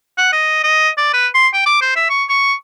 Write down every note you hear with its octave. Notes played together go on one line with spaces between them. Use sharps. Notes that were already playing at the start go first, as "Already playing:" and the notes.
F#5
D#5
D#5
D5
B4
C6
G5
D6
C5
E5
C#6
C#6